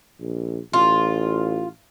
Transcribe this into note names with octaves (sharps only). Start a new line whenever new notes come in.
A#1
A1 F4